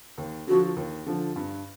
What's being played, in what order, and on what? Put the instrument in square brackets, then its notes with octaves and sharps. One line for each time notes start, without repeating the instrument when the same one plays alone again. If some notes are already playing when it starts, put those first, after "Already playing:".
[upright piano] D#2
[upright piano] D3 F3 [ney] F#4
[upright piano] D#2
D3 F3
G2